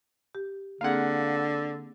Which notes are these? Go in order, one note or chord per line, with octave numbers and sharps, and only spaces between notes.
G4
D3 A#3 C4 G#4 F5 F#5